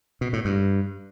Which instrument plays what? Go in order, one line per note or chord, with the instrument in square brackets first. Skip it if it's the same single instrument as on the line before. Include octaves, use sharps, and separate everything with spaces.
[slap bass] B2
A2
G2